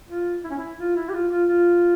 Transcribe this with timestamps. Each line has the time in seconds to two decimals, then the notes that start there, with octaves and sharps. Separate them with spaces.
0.08 F4
0.44 E4
0.51 C#4
0.58 E4
0.79 F4
0.96 E4
1.09 G4
1.14 F4
1.31 F4
1.49 F4